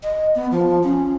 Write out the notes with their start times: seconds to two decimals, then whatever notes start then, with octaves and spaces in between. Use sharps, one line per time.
0.03 D#5
0.35 B3
0.51 F3
0.83 C#4